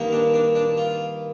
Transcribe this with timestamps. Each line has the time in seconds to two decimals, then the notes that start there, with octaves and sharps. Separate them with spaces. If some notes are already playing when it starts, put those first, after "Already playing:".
Already playing: G2 D#3 A#3
0.12 D4
0.34 D4
0.55 D4
0.77 F4